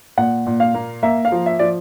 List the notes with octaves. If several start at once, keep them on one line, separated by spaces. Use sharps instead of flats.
A#2 F#5
A#2
F5
A#3
A#3 E5
F5
F3
E5
F3 D5